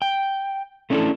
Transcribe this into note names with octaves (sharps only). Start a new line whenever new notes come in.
G5
A3 C#4 D4 E4 A4